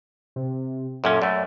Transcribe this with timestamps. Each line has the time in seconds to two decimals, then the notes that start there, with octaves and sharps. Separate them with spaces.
0.36 C3
1.04 F#2 A#2 C#4 A4
1.22 F#2 A3 D5